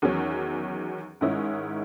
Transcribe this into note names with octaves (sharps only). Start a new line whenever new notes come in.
E2 D#3 F#3 C#4
G#2 D#3 G#3 C#4 E4